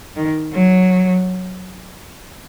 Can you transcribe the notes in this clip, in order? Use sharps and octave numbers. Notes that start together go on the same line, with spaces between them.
D#3
F#3